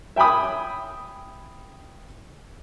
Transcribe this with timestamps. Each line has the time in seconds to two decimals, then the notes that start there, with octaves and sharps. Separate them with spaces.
0.16 E5 G5 G#5 B5 D#6